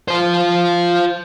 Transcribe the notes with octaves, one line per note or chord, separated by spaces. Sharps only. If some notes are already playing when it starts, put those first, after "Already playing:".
F4 C5